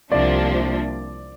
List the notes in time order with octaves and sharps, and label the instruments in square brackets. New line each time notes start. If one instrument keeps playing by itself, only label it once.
[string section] C2 C3 F3 A#3 D4 [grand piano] D5